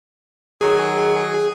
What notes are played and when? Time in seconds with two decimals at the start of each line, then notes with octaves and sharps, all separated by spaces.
0.61 D#3 F#3 G#4